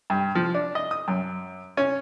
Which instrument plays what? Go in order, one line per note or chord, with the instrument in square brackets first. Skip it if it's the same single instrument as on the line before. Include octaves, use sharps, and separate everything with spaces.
[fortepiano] G2
F3
D4
D#5
D#6
F#2
C#4